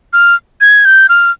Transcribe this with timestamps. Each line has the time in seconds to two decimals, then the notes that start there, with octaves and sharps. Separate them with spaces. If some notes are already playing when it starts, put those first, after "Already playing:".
0.13 F6
0.61 G#6
0.85 G6
1.09 F6